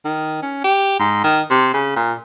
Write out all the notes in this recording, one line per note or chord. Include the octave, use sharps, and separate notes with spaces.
D#3
C#4
G4
G#2
D#3
C3
C#3
A#2